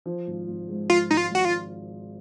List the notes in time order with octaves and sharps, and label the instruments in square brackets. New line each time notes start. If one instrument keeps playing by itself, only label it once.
[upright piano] F3
G#1
G#1
G#2
[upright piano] F3 [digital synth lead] F4
[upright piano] G#1 [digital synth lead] D#4
[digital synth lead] F4
[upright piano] G#1 [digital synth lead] F#4
[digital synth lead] F4